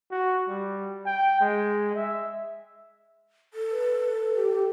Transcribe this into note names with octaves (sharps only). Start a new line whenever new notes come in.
F#4
G3
G5
G#3
E5
A4
B4
G4
G4